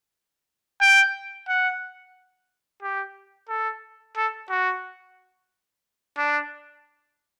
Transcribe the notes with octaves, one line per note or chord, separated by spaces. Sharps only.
G5
F#5
G4
A4
A4
F#4
D4